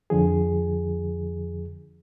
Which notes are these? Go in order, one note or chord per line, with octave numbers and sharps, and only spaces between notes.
F2 D3 F3 G#4